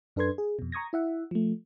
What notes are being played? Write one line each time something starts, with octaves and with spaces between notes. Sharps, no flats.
F#2 D4 A4 B4 C6 G#6
G#4
F2 B2
A#5 C#6 D#6 G#6 A#6
E4 E5 F#5
F3 A3